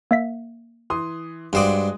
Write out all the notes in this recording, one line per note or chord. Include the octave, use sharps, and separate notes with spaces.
A#3 E5 B6
E3 C6 D#6
G2 G#3 F#4 C5 D5 D#6